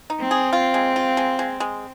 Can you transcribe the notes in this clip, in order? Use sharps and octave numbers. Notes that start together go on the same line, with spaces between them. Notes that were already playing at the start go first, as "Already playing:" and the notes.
D#4
C4
G#4
F4
G#3
F4
G#3
G#3
G#3